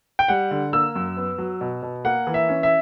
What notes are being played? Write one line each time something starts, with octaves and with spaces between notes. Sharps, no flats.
G5
G3 F#5
D3
A#3 E6
F#2
B3
F#3
B2
B2
A#3 F#5
E3
E5
C#4
E5